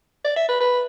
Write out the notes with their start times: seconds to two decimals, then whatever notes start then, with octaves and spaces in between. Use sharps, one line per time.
0.25 D5
0.36 E5
0.49 B4
0.61 B4